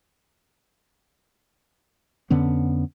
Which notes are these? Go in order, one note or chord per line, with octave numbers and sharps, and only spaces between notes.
F2 D3 B3 C#4